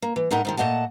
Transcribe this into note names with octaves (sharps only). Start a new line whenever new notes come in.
A#3
E3
A2 G#3 D#4 E4 A#4 F#5
G#2 D#3 F3
A#2 A3 D#5 F#5 A5